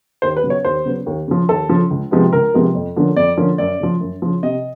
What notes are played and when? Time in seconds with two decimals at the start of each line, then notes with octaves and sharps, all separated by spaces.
0.22 D#2 C5
0.37 B4
0.44 C#3 F#3 B3
0.50 C#5
0.64 D#2 C5
0.85 C#3 F#3 B3
1.06 D#2
1.28 C#3 F3
1.49 D#2 A4
1.69 C#3 F3
1.90 C#2
2.11 C3 F3 G#3 B3
2.32 C#2 A#4
2.54 C3 F3 G#3 B3
2.75 F2
2.96 D3 F3 A#3 C#4
3.16 F2 D5
3.37 D3 F3 A#3 C#4
3.58 F#2 D5
3.80 C#3 F3
4.01 F#2
4.22 C#3 F3
4.43 C3 D#5